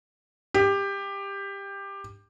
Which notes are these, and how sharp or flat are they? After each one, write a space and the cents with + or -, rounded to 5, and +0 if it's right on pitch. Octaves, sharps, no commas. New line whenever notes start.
G4 +15